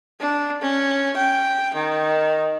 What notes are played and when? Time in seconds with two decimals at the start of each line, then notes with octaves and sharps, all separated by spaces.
0.20 D4
0.62 C#4
1.17 G5
1.75 D#3